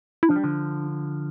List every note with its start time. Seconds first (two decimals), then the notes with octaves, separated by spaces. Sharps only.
0.23 E4
0.29 F3 D4
0.36 G3
0.44 D3 F3